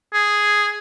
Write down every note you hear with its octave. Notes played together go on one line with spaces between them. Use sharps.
G#4